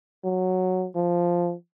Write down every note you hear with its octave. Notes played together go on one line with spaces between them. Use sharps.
F#3
F3